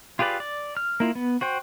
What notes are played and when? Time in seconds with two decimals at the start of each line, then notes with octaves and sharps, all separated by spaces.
0.19 F4 G4 G#4 B4 D5
0.40 D5
0.77 F6
1.00 A#3 E4 F4
1.15 B3
1.41 F#4 C5 G5